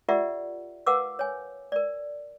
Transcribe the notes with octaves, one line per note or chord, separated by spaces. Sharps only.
F4 G4 A#4 D5 E5 F#5
A#4 B4 F5 F#5 D6 E6
C#5 G#5
A#4 D5